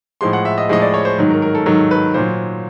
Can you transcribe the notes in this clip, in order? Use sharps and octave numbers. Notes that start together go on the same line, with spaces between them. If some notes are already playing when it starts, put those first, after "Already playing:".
A2 F3 G#3 C6
F#5
E5
D#5
A2 F3 G#3 D#5
D5
C#5
C5
G#2 D#3 F#3
A#4
A#4
A4
G#2 D#3 F#3 A4
B4
A#2 F#3 C5